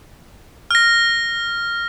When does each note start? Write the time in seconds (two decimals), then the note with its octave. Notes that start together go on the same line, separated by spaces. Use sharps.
0.71 F6 A#6